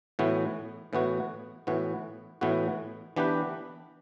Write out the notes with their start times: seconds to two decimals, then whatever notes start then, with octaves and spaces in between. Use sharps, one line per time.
0.19 A2 E3 B3 F#4
0.93 A2 E3 B3 F#4
1.67 A2 E3 B3 F#4
2.41 A2 E3 B3 F#4
3.16 E3 B3 D4 G4 B4